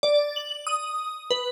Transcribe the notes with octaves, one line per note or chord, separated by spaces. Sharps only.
D5
F#7
D#6
B4